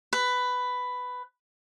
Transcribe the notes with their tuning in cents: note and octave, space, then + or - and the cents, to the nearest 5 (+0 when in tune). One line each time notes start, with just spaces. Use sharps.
B4 +10